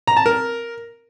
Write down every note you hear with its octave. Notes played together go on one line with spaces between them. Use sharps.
A#5
A5
A#4